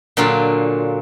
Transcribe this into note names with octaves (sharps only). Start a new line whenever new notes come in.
A#2 D3 F#3 F4